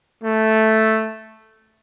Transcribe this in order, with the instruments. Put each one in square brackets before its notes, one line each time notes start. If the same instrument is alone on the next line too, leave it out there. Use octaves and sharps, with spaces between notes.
[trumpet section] A3